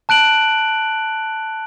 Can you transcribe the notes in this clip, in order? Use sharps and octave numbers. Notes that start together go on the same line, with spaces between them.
A5 F#6 D7 F#7